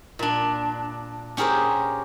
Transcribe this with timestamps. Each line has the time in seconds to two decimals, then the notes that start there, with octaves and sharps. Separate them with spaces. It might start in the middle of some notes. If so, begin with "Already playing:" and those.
0.19 A#2 D4
1.37 C#4 G4 G#4 A#4 C5 C#5